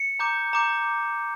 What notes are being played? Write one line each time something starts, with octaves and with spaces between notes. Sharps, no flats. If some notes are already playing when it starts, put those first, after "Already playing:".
Already playing: C#7
A#5 D6 G6
A#5 D6 G6